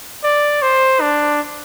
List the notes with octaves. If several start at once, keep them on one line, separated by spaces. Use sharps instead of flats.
D5
C5
D4